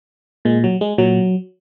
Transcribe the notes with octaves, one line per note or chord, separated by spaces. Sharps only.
A#2 G#3
F#3
G#3
A#2 F#3